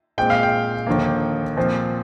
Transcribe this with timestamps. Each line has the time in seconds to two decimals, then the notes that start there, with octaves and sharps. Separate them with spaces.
0.18 A#2 G#3 C4 G5
0.30 F5
0.43 G5
0.87 D#2 D3 F3 A#3
1.57 A#2 F3 C4